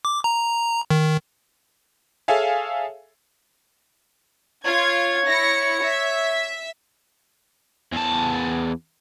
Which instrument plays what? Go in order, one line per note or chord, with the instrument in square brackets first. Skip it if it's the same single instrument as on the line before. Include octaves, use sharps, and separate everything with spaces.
[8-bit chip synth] D6
A#5
D#3
[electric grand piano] G#4 A4 C#5 E5 F5 G#5
[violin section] F4 G#6 [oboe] C#5
[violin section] E4 A#6 C#7
E5
[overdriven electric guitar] E2 A5